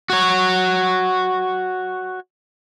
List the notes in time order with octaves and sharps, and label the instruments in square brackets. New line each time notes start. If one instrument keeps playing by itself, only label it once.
[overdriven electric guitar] F#4 C#5